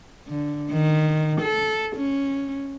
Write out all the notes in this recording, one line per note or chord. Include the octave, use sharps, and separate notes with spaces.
D3
D#3
A4
C#4